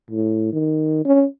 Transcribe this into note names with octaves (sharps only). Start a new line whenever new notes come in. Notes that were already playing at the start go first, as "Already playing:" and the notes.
A2
D#3
C#4